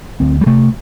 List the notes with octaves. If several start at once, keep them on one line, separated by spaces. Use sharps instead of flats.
D2 C4
G3
C3 A3